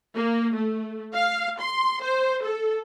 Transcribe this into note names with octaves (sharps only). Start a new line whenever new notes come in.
A#3
A3
F5
C6
C5
A4